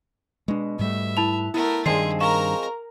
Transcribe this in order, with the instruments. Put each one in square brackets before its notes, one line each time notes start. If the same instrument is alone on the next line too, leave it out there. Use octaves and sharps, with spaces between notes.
[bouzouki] B2 [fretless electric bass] G#3 D4
[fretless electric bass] G#2 G3 A3 [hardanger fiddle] E5
[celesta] E4 A5 F7 [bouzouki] B4
[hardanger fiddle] A3 A#4 [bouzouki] B3 [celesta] E4
[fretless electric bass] G2 D#3 [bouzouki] F3 G#3 C4 [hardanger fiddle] G#4 [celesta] C7
[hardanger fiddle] A#4 A#5 [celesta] F5 C#6 E7